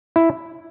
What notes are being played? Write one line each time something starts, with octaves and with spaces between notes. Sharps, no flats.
E4